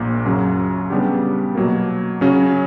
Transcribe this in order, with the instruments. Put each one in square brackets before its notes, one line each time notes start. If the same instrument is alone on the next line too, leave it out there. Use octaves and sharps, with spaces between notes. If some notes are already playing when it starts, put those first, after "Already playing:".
Already playing: [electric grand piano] A#1 A#2 A#3
F#2 C#3 F#3
C#3 G3 B3 D4 G4
B2 F#3 A#3
C#3 F#3 C#4